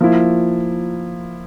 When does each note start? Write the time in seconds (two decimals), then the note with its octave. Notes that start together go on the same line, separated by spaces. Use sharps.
0.01 F3 A#3 E4